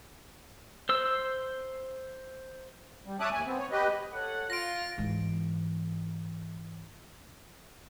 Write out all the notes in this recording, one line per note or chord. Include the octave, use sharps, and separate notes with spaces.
C5 E6
G3
C#5 E5 A5 D6 D#6 F#6
D#2 G#5
B3 C4
C#5
G4 B4 D#5
A4 C#5 F#5
F4 A#6 D7
G#2 E3